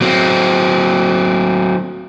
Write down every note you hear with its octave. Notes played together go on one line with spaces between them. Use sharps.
F#3 C4